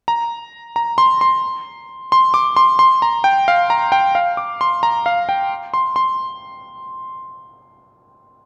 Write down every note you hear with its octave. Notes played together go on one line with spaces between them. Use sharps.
A#5
A#5
C6
C6
C6
D6
C6
C6
A#5
G5
F5
A#5
G5
F5
D6
C6
A#5
F5
G5
C6
C6